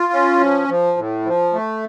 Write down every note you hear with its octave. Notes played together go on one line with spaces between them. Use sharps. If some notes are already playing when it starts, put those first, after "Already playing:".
Already playing: F4
C#4
F3
F3
A2
F3
A3